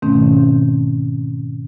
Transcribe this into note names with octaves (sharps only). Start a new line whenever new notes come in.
G#2 B2 D#3 A3 C4 C#4